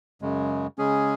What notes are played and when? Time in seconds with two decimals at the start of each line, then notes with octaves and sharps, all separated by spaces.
0.22 F#2 C#3 G#3
0.78 C#3 G#3 C#4 G#4